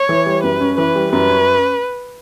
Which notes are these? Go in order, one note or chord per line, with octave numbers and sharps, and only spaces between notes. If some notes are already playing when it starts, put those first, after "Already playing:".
Already playing: C#5
E3
G3
F#2 B4
C#4
E3 B4
G3
F#2 B4
C#4